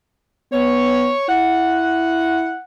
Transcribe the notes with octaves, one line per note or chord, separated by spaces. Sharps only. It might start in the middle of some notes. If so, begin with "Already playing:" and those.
B3 C#5
E4 F#5